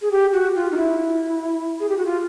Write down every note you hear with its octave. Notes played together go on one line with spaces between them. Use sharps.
G#4
G4
F#4
F4
D#4
E4
G#4
G4
F#4
F4